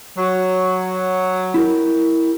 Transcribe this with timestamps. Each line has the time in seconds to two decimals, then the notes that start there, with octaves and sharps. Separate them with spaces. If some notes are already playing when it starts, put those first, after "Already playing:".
0.17 F#3
1.54 E4 G4 A#4